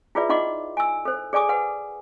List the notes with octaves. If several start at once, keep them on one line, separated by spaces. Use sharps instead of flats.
E4 F4 G#4 B4 D5 E5
D#4 F4 D#5 F#5 C6 D6
G#5 E6
A4 C5
G#4 D5 G#5 D6 D#6
B4 F#5 G#5